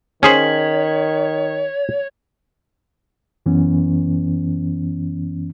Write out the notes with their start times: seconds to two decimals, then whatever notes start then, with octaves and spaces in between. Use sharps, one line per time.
0.23 D#3 C#4 G#4 C5 C#5 G#6 B6 F#7
3.46 F#2 E3 B3 C#4